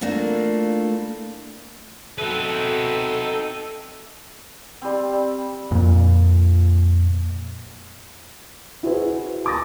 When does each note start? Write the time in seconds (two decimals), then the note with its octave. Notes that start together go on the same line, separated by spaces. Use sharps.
0.01 A3 A#3 D4 E4 F4
2.18 B2 C4 D#4 F#4 A4 B4 E5
4.82 G3 C4
5.71 F2 A#2
8.83 E4 F#4 G#4 B4 C5 E5
9.44 G#5 A5 D6 D#6 A6 A#6